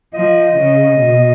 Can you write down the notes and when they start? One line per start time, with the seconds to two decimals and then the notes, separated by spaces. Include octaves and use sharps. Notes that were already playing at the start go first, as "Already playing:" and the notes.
0.14 F3 D#5
0.57 C#3
1.00 B2